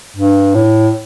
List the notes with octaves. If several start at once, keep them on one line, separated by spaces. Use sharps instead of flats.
G2
A2